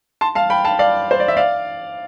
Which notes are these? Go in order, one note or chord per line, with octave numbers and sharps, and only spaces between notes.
A5 C6
F5 A5
G5 B5
F5 A5
D5 F5
C5
D5
E5
D5 F5